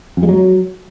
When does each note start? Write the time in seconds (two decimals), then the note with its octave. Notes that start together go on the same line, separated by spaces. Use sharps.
0.17 F2
0.23 G#3
0.29 F#3